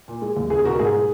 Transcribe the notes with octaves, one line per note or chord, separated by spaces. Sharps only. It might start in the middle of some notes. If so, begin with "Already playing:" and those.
A#2
G#3
D#2
C#2 G#4
B2 F#4 A#4
G#2 G#4
G#3